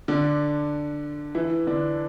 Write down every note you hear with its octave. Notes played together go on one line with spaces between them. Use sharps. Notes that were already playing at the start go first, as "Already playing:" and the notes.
D3 D4
E3 E4
D3 D4